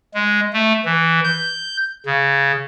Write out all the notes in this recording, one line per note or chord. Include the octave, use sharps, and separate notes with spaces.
G#3
A3
E3
G6
C#3